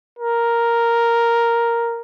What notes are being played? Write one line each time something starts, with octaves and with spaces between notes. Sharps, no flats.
A#4